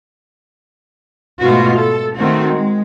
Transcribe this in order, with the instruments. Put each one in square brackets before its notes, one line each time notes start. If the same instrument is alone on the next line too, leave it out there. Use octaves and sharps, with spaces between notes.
[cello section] G#2 B2 A3 B3 F4 F#4
A4
D#3 A3 C4 F#4
G#3